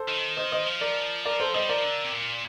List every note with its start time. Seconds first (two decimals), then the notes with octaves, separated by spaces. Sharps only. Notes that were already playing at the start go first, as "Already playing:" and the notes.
Already playing: A4 C5
0.08 D#3
0.37 C5 D#5
0.52 C5 D#5
0.67 F3
0.81 A#4 D5
1.25 A#4 D5
1.40 A4 C5
1.54 G3 C5 D#5
1.69 F3 A#4 D5
1.84 D3
2.04 C3
2.13 A#2